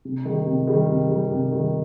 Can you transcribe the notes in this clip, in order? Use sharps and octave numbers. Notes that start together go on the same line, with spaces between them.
C3
D#3 G3
C3
D#3 G3
C3
D#3 G3
C3
D#3 G3